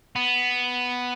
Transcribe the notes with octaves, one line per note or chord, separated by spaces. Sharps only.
B3